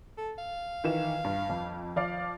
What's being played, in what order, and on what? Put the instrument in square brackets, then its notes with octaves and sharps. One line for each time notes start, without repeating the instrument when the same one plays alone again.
[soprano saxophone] A4
F5
[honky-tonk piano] D#3 E3 E7
G2
F2
F3 D5 F5